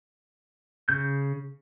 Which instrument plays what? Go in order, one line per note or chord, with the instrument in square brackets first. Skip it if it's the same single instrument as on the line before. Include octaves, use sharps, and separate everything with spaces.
[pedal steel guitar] C#3 G6